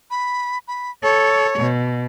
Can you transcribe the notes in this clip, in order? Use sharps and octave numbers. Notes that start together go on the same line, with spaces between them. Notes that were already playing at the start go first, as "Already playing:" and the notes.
B5
B5
A4 C#5
B2